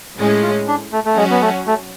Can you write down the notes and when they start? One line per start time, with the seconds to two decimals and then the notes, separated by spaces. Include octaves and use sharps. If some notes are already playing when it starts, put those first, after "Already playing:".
0.18 A2 G#3 C#4
0.43 F4
0.68 D4
0.92 A3
1.05 A3
1.17 F#3 G#3 C#4 F#4
1.30 B3
1.42 A3
1.67 A3